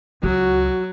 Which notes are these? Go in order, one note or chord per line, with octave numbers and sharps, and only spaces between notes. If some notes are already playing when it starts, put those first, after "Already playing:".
C#2 F#3 F#4